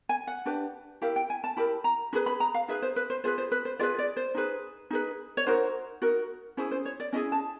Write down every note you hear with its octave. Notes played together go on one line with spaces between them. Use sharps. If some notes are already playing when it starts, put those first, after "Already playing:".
G#5
F#5
D4 G4 B4
E4 G4 A#4 F5
G5
G#5
A5
E4 G4 A#4 B5
A#5
D#4 G#4 B4 B5
B5
A#5
F5
D#4 G#4 B4 E5
C5
B4
C5
F4 G#4 B4 C5
C5
B4
C5
F4 G#4 B4 D5
D5
C5
D#4 G#4 B4
D#4 G#4 B4
C#5
D#4 F#4 A#4 C5
D#4 F#4 A#4
C#4 E4 G#4 C5
C5
C#5
D5
C#4 E4 G#4 D#5
A5